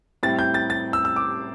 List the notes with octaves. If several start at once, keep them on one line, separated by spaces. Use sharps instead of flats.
A2 G3 C4 E4 A6
G6
A6
A6
E6
E6
D6